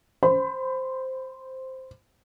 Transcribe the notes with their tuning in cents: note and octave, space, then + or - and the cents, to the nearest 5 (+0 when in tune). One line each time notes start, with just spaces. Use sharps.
C5 +0 B5 +25